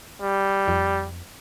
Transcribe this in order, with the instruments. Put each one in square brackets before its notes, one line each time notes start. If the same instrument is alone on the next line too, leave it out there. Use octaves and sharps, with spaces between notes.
[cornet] G3
[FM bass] F2